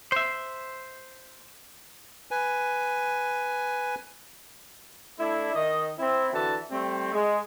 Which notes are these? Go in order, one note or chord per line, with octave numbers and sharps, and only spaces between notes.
C5 E5
B4 G#5
A3 D4 E4
D#3 D#5
C4 E4
D3 E3 F#4 A5
G3 A3 C4
G#3